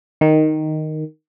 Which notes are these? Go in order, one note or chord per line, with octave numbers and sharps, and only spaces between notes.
D#3